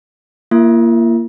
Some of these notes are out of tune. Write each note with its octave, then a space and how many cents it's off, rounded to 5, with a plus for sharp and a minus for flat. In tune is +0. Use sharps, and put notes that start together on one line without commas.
A#3 +0 F4 -45 E5 +0